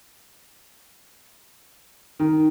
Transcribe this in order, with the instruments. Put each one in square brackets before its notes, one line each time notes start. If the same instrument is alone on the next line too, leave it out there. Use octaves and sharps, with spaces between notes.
[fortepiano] D#3